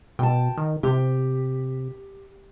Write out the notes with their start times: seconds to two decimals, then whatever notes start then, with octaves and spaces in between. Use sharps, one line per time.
0.19 B2 G5 A5
0.58 D#3
0.83 C3 G4